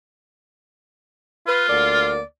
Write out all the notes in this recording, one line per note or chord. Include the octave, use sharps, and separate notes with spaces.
F4 B4
D2 A#3 D5